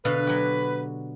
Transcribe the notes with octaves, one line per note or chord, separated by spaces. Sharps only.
B2 D3 B4 F5
F#3 G4